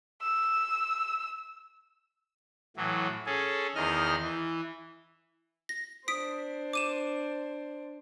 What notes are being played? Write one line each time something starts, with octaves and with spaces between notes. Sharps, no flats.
E6
A2 E3 F#3
C#4 G#4 A4
E2 D#3 D#5 F6
E3
A#6
D4 C5 D#6 B6 D7
D6 D#7 E7